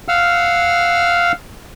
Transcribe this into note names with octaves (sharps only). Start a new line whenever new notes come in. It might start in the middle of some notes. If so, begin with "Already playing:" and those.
F5 F#5 E6 F6